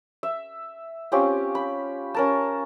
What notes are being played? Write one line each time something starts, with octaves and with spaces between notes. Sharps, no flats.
E5
C4 C#4 F4 G4
B5
C#4 A#4 A5